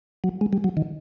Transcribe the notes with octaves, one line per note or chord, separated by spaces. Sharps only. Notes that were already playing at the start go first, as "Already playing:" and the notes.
F#3
G#3
G3
F#3
D#3